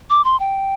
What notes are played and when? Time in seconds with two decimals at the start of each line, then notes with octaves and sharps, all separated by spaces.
0.10 D6
0.25 C6
0.40 G5